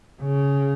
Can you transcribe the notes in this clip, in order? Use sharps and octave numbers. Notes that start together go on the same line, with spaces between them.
C#3